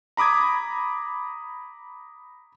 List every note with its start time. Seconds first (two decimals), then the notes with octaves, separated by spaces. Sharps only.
0.17 A#5 B5 D6 D#6 G#6